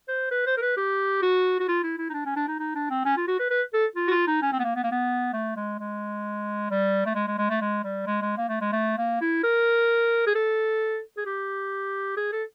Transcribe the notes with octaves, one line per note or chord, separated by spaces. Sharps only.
C5
B4
C5
A#4
B4
G4
F#4
F#4
F4
E4
E4
D#4
D4
C#4
D4
D#4
D#4
D4
C4
C#4
F4
F#4
B4
B4
A4
F4
F#4
F4
D#4
C#4
C4
B3
A#3
B3
A#3
B3
A3
G#3
G#3
G3
A3
G#3
G#3
G#3
A3
G#3
G3
G#3
G#3
A#3
A3
G#3
A3
A#3
E4
A#4
G#4
A4
G#4
G4
G#4
A4